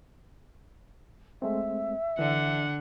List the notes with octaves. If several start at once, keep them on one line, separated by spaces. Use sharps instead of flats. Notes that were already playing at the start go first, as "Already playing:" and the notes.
G#3 A3 C4 E5
D3 E3 D4 F#5